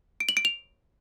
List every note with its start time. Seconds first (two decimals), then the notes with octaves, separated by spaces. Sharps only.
0.20 D7
0.29 F#7
0.37 D7
0.45 F7